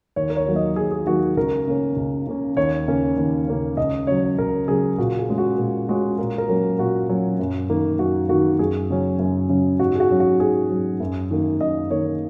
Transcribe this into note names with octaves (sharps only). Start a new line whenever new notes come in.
D#2 C#5
A#4
C#5
D#3 F#3 A#3
D#5
D#2 G#4
G#4
D#3 F#3 A#3 F#4
C#2 A#4
C#3 A#3 C#4
C#2
C#3 A#3 C#4
D#2 C#5
C#3 A#3 C#4
D#2
C#3 A#3 C#4
C#2 D#5
C#3 F#3 C#5
C#2 A#4
C#3 F#3 G#4
A#2 F#4
G#4
G#3 C#4
F#4
A#2
G#3 C#4 F#4
A#2 A#4
A#4
F#3 A#3 C#4
A#2 F#4
F#3 A#3 C#4
F#2
D#3 A#3
F#2 F#4
D#3 A#3 F#4
F#2 G#4
C#3 F#3 C#4
F#2
C#3 F#3 C#4
G#2 F#4
G#4
F#4
F#3 C#4
F#4
G#2 G#4
F#3 C#4
F#2
D#3 A#3
F#2 D#5
D#3 A#3 C#5